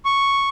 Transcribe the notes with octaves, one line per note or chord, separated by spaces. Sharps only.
C#6